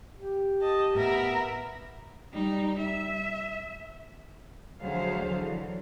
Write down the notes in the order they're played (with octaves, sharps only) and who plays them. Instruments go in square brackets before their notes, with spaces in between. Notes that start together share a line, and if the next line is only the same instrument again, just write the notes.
[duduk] G4
[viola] D#5 [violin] A5
[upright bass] A2 [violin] B3 E5 [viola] A#4 A#5
[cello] G3 D#4
E5
[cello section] D2 F3 F#3 G#4 C5 F5
D3 E3 F#3